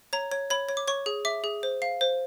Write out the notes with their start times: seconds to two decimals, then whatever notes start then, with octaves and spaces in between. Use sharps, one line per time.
0.13 C#5 A#5
0.32 C#5
0.50 C#5 B5
0.69 C#5
0.77 D6
0.88 C#5 C#6
1.06 G#4
1.25 E5 D6
1.44 G#4
1.63 C5
1.82 F5
2.01 C5